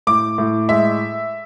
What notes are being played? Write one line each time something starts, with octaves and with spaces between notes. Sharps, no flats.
A2 D6
A2
G#3 E5